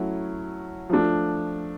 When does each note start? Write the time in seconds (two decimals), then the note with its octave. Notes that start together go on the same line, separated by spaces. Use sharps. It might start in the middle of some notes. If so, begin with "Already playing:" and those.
Already playing: F#3 A3 C#4 E4
0.89 F3 A3 D4